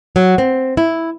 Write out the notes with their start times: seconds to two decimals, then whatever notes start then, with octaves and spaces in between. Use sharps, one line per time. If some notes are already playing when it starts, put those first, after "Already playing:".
0.16 F#3
0.38 C4
0.77 E4